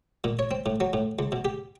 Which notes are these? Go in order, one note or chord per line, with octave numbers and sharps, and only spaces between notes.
A#2
C#5
C4
A2
F#3
A2
C#2
B2
G4